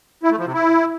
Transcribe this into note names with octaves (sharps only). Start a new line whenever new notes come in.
E4
A3
F3
C3
E4